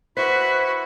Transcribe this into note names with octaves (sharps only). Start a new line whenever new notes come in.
E4 F#4 B4 C5